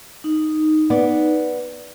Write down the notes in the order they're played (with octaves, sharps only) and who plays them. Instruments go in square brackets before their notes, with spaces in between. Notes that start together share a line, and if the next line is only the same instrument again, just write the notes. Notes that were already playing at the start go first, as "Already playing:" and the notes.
[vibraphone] D#4
[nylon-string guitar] B3 D5